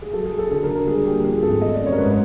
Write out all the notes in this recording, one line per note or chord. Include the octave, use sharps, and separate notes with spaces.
G#4
F#3 A4
G#4
F#3
A4
D3 A4
A#4
D3
A#4
G3 G#4
A#3 G4
F3 G#4
G#1 A4
A3 D#5
D5
F#2
C#5
A#4
G#2 B4
C#5